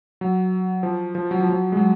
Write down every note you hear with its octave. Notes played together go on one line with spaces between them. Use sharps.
F#3
F3
F3
F#3
F3
F#3
G#3
F#3